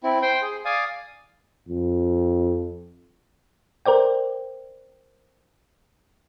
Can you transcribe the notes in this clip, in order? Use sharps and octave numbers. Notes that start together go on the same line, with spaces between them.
C4 E4
C5 G5 C6
G#4
D5 F5 G#5 D#6
F2
A#4 C5 D5 G5